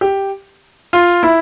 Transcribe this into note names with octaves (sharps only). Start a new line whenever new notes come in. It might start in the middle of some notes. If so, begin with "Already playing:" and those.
G4
F4
E4